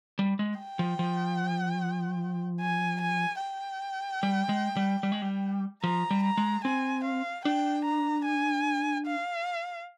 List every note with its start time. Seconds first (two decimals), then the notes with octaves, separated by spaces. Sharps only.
0.19 G3
0.39 G#3
0.60 G5
0.79 F3
0.99 F3
2.61 G#5
3.01 G#5
3.41 G5
4.23 G3
4.49 G#3
4.77 G3
5.03 G3
5.12 G#3
5.22 G3
5.84 F3 A#5
6.11 G3
6.23 A#5
6.38 G#3
6.64 C4 G#5
7.04 F5
7.45 D4 G5
7.85 A#5
8.25 G#5
9.07 F5